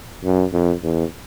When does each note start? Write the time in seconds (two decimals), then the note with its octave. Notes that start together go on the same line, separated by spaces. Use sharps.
0.24 F#2
0.53 F2
0.83 E2